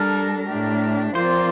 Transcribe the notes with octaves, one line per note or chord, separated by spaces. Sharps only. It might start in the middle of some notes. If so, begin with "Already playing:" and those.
Already playing: G3 D4 A4 A#4
A2 A3 D4 G4
F3 C4 F4 A#4 C5 D5